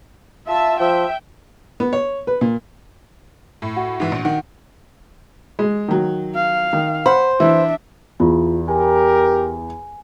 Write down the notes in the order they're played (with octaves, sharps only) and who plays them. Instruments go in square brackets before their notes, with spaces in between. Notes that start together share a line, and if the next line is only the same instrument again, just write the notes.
[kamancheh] F4 A5 [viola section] E5
[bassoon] F3 [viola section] E5 [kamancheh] G5
[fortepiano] B3
C#5
B4
A#2
[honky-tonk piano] A2
[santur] F#4
[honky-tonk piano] G#2 E3 E4
A#1
[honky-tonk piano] D#3 [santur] F#5
[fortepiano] G#3
D#3 F#3
[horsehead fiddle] F5
[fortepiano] D#3
[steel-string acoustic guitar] C5 [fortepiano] F#5 B5
[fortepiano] E3 [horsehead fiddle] D4 E5
[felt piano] E2 [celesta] F4
[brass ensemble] G4 A#4 [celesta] G#5